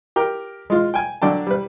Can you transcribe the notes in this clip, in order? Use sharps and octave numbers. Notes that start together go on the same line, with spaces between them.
G4 A#4 G5
G#3 F4
G5 G#5
D3 F#3 D4 G5 A5
G3 B4